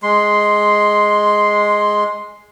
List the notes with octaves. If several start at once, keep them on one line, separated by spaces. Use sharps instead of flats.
G#3 C6